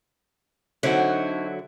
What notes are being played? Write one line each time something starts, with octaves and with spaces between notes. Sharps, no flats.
D3 F#3 C4 D#4 E4 F#4